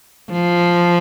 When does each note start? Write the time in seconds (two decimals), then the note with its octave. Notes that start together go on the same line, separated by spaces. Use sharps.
0.32 F3